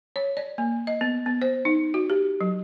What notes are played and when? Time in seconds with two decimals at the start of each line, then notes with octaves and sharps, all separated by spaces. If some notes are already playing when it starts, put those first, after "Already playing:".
0.16 C#5
0.37 D5
0.58 A#3
0.87 D#5
1.01 B3
1.26 B3
1.42 C5
1.65 D#4
1.94 F#4
2.10 G4
2.41 F#3